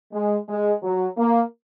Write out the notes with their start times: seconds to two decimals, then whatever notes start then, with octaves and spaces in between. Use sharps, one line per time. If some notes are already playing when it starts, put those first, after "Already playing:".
0.13 G#3
0.49 G#3
0.83 F#3
1.18 A#3